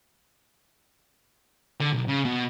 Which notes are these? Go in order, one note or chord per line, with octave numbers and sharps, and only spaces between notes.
D3
B1
C#3
B2